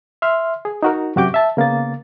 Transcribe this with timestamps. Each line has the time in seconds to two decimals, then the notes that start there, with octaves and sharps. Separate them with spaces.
0.22 E5 C6 F6
0.65 G#4
0.83 D#4 F#4 A#4
1.16 F#2 C3 F#4 G4 D6 G6
1.34 E5 A5
1.57 C#3 A#3 B3 A6